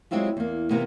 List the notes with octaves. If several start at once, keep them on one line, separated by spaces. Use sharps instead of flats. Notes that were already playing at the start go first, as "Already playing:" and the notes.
F#3 G#3 C4 E4 F4 G4
E2 A#3
C3 E3 A#3 B3